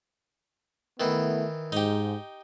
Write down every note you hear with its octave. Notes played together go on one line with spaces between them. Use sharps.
D#3 E3 A3 B3 E4
G#2 D#4 G4